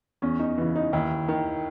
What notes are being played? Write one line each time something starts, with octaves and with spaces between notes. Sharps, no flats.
E2 C#4
D#4
C#3 E3
D#4
D#2 E4
D#3